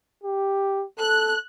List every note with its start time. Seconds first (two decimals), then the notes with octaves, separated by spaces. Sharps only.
0.24 G4
0.99 A4 F#6